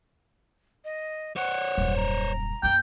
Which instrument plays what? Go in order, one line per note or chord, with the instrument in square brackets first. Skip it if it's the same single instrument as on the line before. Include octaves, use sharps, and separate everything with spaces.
[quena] D#5
[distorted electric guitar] C5 C#5 [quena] F#5
[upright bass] D#1 F#2
[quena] A#5
[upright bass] F#2 A#3 [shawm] G5